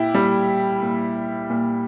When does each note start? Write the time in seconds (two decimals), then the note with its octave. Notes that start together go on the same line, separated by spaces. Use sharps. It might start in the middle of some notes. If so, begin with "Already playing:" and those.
Already playing: A#2 E4 G4
0.14 A#2 G3
0.82 A#2
1.50 A#2